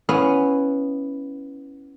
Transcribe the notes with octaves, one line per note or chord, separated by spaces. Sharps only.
B3 C#4 E4 F5 F#5